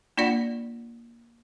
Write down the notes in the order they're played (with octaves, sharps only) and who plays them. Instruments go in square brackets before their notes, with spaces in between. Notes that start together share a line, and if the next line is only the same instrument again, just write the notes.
[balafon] A#3 D4 F4 D5 F#5